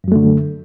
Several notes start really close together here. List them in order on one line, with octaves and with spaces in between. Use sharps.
F#2 F#3 A3 D3